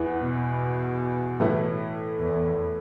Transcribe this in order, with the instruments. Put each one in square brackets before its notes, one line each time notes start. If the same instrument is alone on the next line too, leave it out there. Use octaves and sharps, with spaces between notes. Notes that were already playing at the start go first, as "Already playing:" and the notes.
Already playing: [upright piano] E2 E3 B3
[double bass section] B2
[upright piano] A2 E3 A3 E4
[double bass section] E2